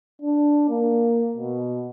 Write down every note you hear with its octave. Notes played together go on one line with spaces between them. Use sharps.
D4
A#3
B2